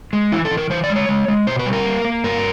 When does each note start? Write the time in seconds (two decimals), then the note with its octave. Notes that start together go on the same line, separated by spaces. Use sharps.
0.13 G#3
0.32 E3 E4
0.45 A4
0.51 E3
0.57 A#4
0.70 E3 C5
0.84 D5
0.90 G#3
0.96 C#5
1.09 G#3
1.28 G#3
1.47 B2 C5
1.59 B4
1.66 G3
1.73 A#4
1.85 A#3
2.05 A#3
2.24 G2 A#4